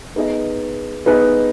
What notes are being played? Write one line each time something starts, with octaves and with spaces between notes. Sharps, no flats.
B3 D#4 G#4 B4 D#5
B3 D#4 G#4 B4 D#5